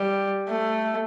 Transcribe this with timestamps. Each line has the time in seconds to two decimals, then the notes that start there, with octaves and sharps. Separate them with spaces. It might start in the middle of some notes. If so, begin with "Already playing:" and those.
Already playing: G3
0.49 A3